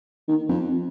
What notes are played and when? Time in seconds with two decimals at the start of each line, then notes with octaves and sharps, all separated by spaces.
0.28 D#3
0.49 F2